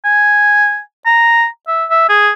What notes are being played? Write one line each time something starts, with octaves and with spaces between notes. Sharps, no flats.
G#5
A#5
E5
E5
G#4